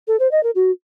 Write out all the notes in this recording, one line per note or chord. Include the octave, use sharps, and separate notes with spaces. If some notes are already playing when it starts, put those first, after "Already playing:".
A4
C5
D#5
A#4
F#4